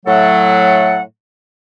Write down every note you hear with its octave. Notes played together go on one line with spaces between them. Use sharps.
A2 F#3 A3 A4 F#5